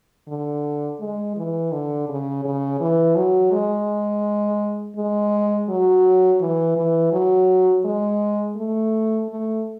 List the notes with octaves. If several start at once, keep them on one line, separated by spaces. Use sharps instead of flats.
D3
G#3
E3
D3
C#3
C#3
E3
F#3
G#3
G#3
F#3
E3
E3
F#3
G#3
A3
A3